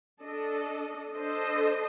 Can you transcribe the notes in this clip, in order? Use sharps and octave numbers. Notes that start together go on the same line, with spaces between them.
D4 A4 D#5
D4 A4 C5 D#5